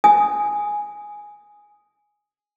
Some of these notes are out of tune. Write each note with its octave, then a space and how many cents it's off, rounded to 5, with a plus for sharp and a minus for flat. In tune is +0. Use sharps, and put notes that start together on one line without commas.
G#5 +0 D#6 +0